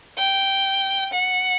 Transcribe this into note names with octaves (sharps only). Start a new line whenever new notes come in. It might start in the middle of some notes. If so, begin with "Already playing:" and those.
G5
F#5